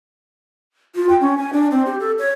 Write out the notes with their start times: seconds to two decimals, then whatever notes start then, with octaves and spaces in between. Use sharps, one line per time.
0.95 F4
1.09 G5
1.21 C#4
1.38 G#5
1.53 D4
1.71 C4
1.86 G4
2.00 A4
2.19 C#5